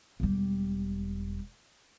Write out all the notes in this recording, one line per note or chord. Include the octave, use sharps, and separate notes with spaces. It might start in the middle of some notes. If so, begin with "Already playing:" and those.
E1 G3